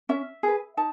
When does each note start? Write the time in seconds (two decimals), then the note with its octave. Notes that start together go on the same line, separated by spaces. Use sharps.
0.09 C#4 E5
0.43 G#4 B4
0.77 D#4 A5